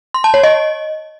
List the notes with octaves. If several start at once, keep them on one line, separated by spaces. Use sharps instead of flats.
C6
A5
C#5
D#5